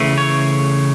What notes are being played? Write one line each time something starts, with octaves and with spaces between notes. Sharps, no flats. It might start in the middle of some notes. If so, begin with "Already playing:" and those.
Already playing: C#3 E3 A3
C#5